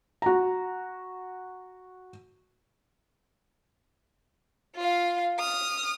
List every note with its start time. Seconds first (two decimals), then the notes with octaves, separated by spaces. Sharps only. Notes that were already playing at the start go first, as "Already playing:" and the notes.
0.22 F#4 A#5
4.77 F4 F5
5.38 D#6 F6